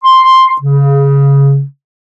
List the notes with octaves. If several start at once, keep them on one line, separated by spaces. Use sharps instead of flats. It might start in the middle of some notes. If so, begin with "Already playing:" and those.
C6
C#3